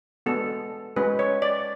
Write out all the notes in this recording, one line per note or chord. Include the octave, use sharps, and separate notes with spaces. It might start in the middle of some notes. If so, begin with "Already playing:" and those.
G#3 B3 D4 F#4 A4
G#3 C#4 F#4 B4
C#5
D5